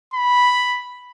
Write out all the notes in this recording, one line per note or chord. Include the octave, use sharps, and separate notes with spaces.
B5